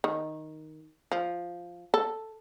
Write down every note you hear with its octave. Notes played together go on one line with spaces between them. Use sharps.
D#3
F3
A4